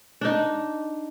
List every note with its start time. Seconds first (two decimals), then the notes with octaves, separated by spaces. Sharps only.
0.21 D4 D#4